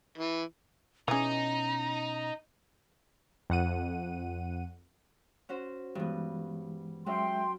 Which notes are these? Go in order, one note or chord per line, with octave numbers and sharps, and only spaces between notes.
E3
B2 E3 C#4 D#4 G#4 A#5
F2 F#5 D#7
C#4 F#4 C5
G2 E3 G#3 B3
F#3 G#3 C#4 E5 G5 C6